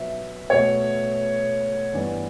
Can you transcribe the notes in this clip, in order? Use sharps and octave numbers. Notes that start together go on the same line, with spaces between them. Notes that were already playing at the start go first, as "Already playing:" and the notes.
Already playing: B2 F#3 B3 E5
B2 A3 C#5
G2 E3 B3 D5